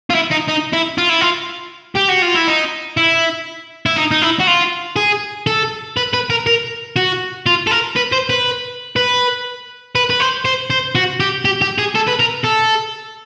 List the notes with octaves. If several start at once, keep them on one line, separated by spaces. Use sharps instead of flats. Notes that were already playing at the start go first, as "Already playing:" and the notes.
F4
E4
D#4
D#4
E4
F4
E4
F4
G4
F#4
F4
E4
D#4
E4
E4
D#4
D#4
E4
F#4
F4
G#4
A4
B4
B4
A#4
A#4
F#4
F4
A4
A#4
B4
C5
B4
B4
B4
B4
C5
C5
C5
F#4
G4
G4
G4
G#4
A4
B4
A#4
A4